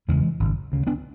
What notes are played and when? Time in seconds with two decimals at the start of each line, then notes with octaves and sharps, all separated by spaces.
0.08 F#1 E2 C#3 E3 G#3
0.40 G#1 F#2 C#3
0.72 D2 C#3
0.87 B3 D4